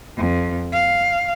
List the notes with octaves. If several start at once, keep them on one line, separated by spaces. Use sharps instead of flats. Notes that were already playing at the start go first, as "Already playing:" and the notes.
F2
F5